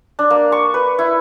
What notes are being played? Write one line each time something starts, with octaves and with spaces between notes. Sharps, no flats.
D4
A#3
C#6
B4
E4